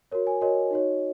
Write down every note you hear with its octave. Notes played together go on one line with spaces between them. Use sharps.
F#4 A#4 C#5
G#5
F#4 A#4 C#5 D#5
D#4 F#4 C#5